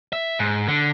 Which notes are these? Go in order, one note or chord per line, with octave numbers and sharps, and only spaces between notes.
E5
G#2
D3